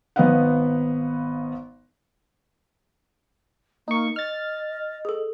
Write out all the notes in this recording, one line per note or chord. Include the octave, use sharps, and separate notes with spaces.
G#1 B3 B4 D#5 F5 F#5
A#3 D#4 C#6
D#5 F6 A6
G#4 A4